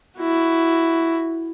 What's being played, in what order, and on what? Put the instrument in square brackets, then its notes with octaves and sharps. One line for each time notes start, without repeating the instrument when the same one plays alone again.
[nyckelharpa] E4 F#4